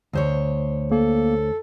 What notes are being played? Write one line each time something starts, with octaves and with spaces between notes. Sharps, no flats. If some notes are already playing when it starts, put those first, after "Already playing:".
D2 C5 C#5
A#3 A4